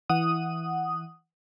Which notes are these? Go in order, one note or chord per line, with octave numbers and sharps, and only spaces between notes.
E3 F#5 D#6